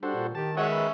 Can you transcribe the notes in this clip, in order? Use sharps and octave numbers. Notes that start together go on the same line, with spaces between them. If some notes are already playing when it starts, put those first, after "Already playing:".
G3 D4 F#4 A4 C5
A#2
D#3 G4 A5
G#3 C#4 F#4 C#5 E5 F#5
B4